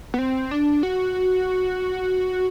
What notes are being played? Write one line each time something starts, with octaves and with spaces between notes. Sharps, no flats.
B3
C4
D4
F#4